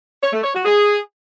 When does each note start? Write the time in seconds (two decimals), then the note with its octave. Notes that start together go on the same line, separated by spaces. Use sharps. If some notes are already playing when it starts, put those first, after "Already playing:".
0.22 C#5
0.33 A3
0.44 C#5
0.54 F#4
0.65 G#4